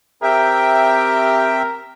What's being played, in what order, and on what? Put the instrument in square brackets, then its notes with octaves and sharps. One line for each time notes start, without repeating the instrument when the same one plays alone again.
[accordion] C4 E5 G5 [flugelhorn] G4 [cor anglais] A#4